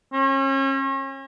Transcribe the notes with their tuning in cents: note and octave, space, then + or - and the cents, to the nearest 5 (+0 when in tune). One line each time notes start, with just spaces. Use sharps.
C#4 -35